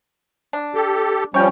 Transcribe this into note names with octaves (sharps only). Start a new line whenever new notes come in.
D4
G4 A4
F3 G3 C#4 C#5 G5